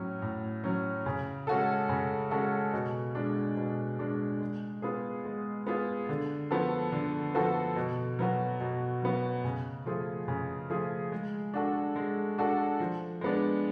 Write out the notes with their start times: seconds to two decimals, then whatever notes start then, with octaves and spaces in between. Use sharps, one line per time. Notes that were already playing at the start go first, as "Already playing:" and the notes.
Already playing: A2 F#3 C#4
0.22 A2
0.64 F#3 C#4
1.06 C#3
1.47 G#3 C#4 F#4 A4
1.89 C#3
2.31 G#3 C#4 F#4 A4
2.73 B2
3.15 G#3 D4
3.57 B2
3.99 G#3 D4
4.41 G#3
4.82 B3 F4 G#4
5.25 G#3
5.67 B3 F4 G#4
6.09 D3
6.51 F3 B3 F#4 A4
6.92 D3
7.35 F3 B3 F#4 A4
7.76 B2
8.19 F#3 B3 F#4
8.61 B2
9.02 F#3 B3 F#4
9.44 C#3
9.86 F3 A3 F4 G#4
10.28 C#3
10.70 F3 A3 F4 G#4
11.12 G#3
11.54 D4 F#4 A4
11.96 G#3
12.38 D4 F#4 A4
12.80 F3
13.21 G#3 B3 D4